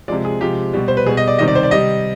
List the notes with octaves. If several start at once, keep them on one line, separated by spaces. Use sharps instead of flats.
C3 F3 G#3 D5
G#4
C3 F3 G#3 G4
B2 G3
C5
B4
B2 G3 G#4
D#5
D5
C3 D#3 G3 D#5
D5
C5
D5
C3 G3 D#5